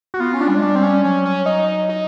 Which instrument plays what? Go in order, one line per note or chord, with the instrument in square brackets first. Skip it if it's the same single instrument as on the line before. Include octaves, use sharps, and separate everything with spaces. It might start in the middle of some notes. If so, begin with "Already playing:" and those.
[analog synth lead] F#4
[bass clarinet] B3 [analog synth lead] F4
[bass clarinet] C#4
[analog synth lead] D4
[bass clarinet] G3
G#3
[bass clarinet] G3 [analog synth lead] D4
[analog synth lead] C4
C#4
[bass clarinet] F#3 [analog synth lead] C#4
[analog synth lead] C#4
D#4
D#4